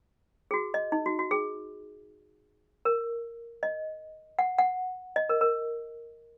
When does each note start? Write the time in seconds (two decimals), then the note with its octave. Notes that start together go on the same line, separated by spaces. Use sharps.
0.51 G#4
0.54 F#4
0.74 D#5
0.92 D#4
1.06 F#4
1.19 F#4
1.31 G#4
2.85 A#4
3.63 D#5
4.39 F#5
4.59 F#5
5.16 D#5
5.29 A#4
5.41 A#4